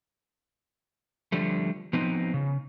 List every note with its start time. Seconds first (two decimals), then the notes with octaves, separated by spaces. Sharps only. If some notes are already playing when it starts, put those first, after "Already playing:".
1.32 D3 F3 G3 A3
1.93 F3 B3 C4 D#4
2.34 C#3